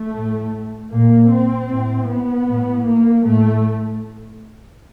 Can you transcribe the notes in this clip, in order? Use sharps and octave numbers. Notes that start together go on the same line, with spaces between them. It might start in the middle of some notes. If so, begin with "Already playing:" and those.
Already playing: A3
A2
A#2 A#3
C4
A2
B3
A2
A#3
A2 A3